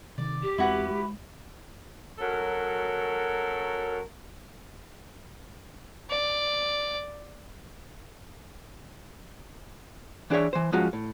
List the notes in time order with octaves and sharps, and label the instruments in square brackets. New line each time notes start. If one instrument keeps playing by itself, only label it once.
[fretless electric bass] C3 D#3 [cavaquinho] D5
[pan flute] G4
[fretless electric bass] E2 G#3 C4 [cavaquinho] E4 F#4 B4
[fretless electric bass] G#3
[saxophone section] F#2 F#3 A4 A#4
[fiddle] D5
[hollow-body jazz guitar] E3 D4 G#4 C#5 E5
E3 C5
F3 G#3 C#4 F4 F#4
A2